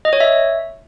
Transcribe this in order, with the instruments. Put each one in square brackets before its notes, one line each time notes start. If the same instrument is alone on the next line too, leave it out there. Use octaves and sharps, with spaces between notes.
[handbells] D#5
C#5
E5